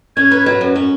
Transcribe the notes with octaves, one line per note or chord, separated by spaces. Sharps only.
C#4 G#6
B4
F#3
F#2
C#4